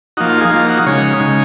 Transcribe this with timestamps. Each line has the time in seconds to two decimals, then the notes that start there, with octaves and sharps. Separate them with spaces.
0.17 F3 A#3 D#4 F#4
0.30 F4
0.41 G#4
0.51 F3 A#3 D#4 F4
0.69 F#4
0.86 C#3 G#3 D#4 C#5
1.20 C#3 G#3 D#4